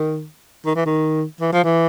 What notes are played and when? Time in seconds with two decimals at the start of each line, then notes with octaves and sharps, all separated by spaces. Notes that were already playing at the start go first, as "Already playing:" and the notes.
Already playing: D#3
0.66 D#3
0.75 E3
0.86 D#3
1.41 E3
1.53 F3
1.64 E3